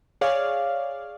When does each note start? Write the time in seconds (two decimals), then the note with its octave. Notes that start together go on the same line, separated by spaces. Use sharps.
0.21 G#4 C#5 D5 F5